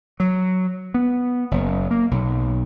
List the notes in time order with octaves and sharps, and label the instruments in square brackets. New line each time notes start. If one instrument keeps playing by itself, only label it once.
[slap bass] F#3
B3
F#1
A#3
B1